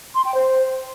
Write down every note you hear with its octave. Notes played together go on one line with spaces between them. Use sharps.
C6
G5
C5